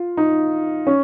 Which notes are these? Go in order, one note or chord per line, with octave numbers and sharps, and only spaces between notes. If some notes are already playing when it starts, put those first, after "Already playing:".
Already playing: F4
D#4
C#4